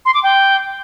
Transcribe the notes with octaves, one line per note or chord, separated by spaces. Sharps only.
C6
D6
G5